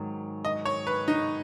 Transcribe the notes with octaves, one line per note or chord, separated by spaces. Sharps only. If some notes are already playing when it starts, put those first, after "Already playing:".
Already playing: G#2 D#3 F#3
D#5
C#5
B4
D#4